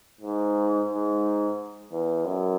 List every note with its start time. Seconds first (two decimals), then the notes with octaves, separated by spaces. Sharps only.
0.21 G#2
0.88 G#2
1.91 E2
2.25 F#2